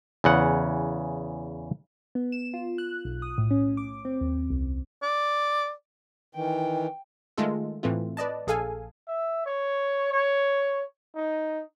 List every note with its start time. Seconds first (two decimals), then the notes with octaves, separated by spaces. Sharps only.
0.24 E2 C#3 F#5
2.15 B3
2.32 E7
2.54 F4
2.78 F#6
3.05 B1
3.22 D#6
3.38 A2
3.51 C#4
3.77 D6
4.05 C4
4.21 D#2
4.50 C2
5.03 D5
6.35 D#3 E3 G5
7.38 D#3 G#3 A3 F4 A4
7.83 A2 E3 A3 C4 F4
8.17 B4 D5 D#5 A5
8.47 A#1 G#4 A4 F5 G#5
9.08 E5
9.46 C#5
10.12 C#5
11.16 D#4